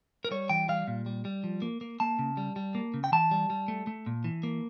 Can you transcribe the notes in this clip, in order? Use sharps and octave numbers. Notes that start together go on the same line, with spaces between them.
A#4
G3 C#5
E3 G5
G3 F5
A#2
G3
G3
F3
A#3
A#3
A#3 A5
C#3
G3
G3
A#3
C#3
G5
E3 A5
G3
G3
A3
A3
A#2
E3
A#3